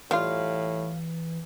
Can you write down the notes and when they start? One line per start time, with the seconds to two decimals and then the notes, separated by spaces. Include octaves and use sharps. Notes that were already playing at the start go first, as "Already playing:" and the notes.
0.11 A2 E3 G3 F4 F5